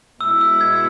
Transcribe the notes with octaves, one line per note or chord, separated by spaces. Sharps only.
B2 G#3 E4 E6
E6
G#6